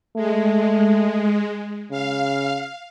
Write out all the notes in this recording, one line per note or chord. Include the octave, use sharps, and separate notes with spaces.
G#3 A3
C#3 F5